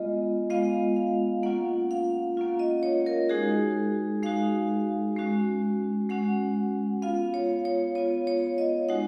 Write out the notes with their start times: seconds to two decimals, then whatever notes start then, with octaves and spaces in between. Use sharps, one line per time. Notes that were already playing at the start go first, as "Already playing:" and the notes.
Already playing: G#3 B3 F4 D#5
0.50 G#3 B3 F4 F5
0.96 F5
1.43 A#3 C#4 F4 F#5
1.91 F5
2.37 A#3 C#4 F4
2.59 D#5
2.83 C#5
3.06 A#4
3.29 G#3 D#4 F#4 G#4
4.23 G#3 D#4 F#4 F5
5.16 G#3 C#4 F#4
6.09 G#3 C#4 F#4 F#5
7.02 B3 F4 F5
7.34 C#5
7.65 C#5
7.95 B3 F4 C#5
8.27 C#5
8.58 D#5
8.89 G#3 D#4 F#4 F#5